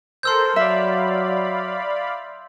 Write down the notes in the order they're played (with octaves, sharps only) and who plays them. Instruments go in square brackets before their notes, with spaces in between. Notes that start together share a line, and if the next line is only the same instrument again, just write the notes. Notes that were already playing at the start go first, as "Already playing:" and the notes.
[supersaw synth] A4 A#4 C5 [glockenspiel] C6 E6 G6
[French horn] F#3 [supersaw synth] D5 F5 B5 [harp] E5